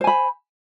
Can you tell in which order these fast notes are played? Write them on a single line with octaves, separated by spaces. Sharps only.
C5 G#5 B5